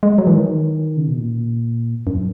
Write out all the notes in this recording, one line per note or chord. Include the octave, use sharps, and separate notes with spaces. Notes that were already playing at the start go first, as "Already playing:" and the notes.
G#3
F#3
E3
D#3
C#3
B2
A#2
F#2